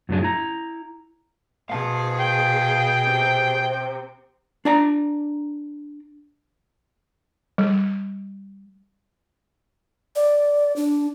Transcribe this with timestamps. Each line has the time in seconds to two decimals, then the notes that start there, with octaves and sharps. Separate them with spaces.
0.09 F#2 A2 C#3 F#3 D4 G#4
0.23 E4 A#5
1.70 B2 G#4 F5 A5
2.20 G5
3.07 C3
4.65 D4 D5 A#5
7.58 G3
10.16 D5
10.76 D4